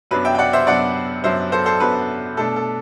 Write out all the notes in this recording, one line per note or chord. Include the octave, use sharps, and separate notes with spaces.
F#2 F#3 B3 D4 B4
E5 G5
G5
D5 F#5
C5 E5
F#2 F#3 B3 D4 D5 F#5
F#2 F#3 B3 D4 C5 E5
A4 C5
A4 C5
F#2 F#3 B3 D4 B4
B2 A3 D4 A4
A4